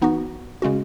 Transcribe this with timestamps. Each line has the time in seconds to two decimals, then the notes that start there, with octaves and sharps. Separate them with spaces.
0.01 E3 B3 D#4 F#4
0.62 C#3 G#3 C#4 F#4